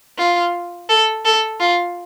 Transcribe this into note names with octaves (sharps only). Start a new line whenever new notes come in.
F4
A4
A4
F4